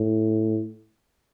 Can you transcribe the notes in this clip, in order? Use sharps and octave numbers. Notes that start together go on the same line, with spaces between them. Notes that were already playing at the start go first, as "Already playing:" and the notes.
Already playing: A2